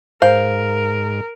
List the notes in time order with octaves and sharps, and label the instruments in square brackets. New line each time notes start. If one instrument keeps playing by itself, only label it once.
[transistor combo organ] G#2 [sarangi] A#4 [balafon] C5 [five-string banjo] F5